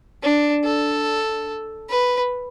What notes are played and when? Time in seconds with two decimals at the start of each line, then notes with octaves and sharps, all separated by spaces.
0.23 D4
0.64 A4
1.90 B4